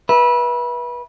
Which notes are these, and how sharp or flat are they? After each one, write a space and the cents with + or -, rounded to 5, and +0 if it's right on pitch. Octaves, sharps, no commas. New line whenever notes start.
B4 -25 E5 +0